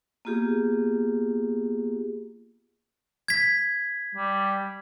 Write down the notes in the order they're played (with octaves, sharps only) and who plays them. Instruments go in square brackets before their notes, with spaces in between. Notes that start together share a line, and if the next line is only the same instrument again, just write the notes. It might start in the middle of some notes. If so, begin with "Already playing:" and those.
[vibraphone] A#3 B3 F4 G4 G#4
[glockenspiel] G#6 B6
[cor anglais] G3